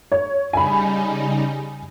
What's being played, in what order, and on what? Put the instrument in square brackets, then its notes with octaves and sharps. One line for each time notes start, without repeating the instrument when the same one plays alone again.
[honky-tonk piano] C#5
[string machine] C#3 G3 D#4 [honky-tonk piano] G#5 B5